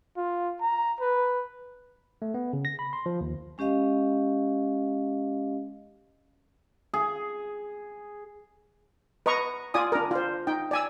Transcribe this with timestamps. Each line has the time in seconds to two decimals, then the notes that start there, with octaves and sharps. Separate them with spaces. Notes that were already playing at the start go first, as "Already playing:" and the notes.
0.17 F4
0.61 A#5
1.00 B4
2.22 A3
2.34 B3
2.53 C#3
2.65 A#6
2.79 B5
2.93 C6
3.06 F3
3.21 D#2
3.58 G#3 C#4 G4 D#5 F5
6.94 G#4
9.26 B4 D#5 A#5 C#6
9.74 F4 D5 G#5 D#6
9.92 D4 A#4
10.11 F4 C5
10.47 D#4 G5
10.71 D5 G#5 E6